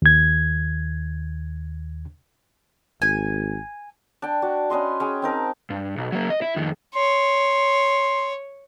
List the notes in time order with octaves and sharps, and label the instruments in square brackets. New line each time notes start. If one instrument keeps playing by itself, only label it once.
[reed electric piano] D#2 G#6
[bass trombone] G#1 [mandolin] G#5
[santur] D4 G5
F#4 D5
C#4 B4 D#5 C6
C#4 G#4 G5
C4 D#4 A#4 A5
[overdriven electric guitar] G2
B1
F#3 A#3
D#5
E4
F2 D#3
[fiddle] C#5 [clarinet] C6